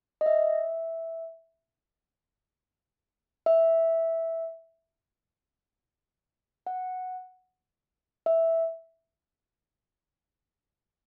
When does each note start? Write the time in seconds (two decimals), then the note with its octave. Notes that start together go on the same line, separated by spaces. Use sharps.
0.21 D#5
0.26 E5
3.46 E5
6.67 F#5
8.26 E5